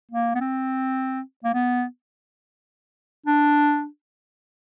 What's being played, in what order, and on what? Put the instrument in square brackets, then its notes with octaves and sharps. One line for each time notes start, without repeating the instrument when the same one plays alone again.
[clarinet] A#3
B3
C4
A#3
B3
D4